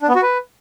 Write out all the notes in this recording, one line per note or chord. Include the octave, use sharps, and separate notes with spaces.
D4
B3
F#4
B4